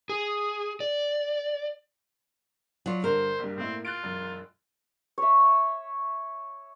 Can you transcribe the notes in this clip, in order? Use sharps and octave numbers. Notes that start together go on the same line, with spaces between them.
G#4
D5
F#3 F4 D5
G2 D3 A#4 C5
A#1 G2
A2 A#3 C4 E4
F4 F#6 A6 D7
E1 F#2
C#5 E5